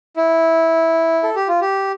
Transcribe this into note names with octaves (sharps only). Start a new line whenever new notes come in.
E4
A4
G4
F4
G4